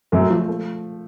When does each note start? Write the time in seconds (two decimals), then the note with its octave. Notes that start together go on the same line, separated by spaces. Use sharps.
0.12 F#2 A3
0.29 F3
0.48 A3